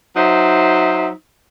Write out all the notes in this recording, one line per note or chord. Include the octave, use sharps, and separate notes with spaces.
F#3 D#4 C5 E5